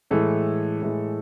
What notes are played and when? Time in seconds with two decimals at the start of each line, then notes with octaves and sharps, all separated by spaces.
0.11 A2 E3 G#3 A4
0.82 A2 E3 G#3